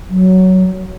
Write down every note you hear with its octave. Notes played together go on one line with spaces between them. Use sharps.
F#3